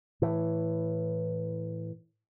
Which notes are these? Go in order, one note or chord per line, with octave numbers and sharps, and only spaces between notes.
A2 E3